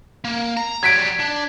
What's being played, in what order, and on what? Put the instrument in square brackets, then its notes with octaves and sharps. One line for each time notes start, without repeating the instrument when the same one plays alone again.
[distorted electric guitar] A#3
A#5
[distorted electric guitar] F#3 G3 [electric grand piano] G#6 B6 D7
[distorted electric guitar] D4